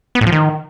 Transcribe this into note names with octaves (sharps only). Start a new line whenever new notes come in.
B3
A2
F3
D#3